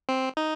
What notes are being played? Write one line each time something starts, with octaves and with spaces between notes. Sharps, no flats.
C4
D#4